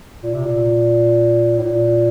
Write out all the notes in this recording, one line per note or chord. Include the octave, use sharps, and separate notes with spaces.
A#2
C3
A#2
A2
A#2